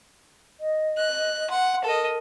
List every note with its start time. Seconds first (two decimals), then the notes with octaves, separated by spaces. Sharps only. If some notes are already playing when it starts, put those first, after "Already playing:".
0.60 D#5
0.98 F#6
1.50 F#5 C6
1.84 A4 A#4 D#5